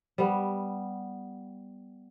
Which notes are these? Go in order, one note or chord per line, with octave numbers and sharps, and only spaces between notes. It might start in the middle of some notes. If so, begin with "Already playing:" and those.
G3 B3